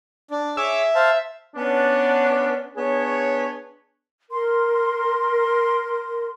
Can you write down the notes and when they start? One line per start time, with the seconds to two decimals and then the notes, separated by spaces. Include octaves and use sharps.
0.31 D4
0.57 G#4 C#5 E5 D6
0.95 C5 F5 A5
1.56 B3 C#4 D4
2.77 B3 D4 G#4 C#5
4.31 A#4 C6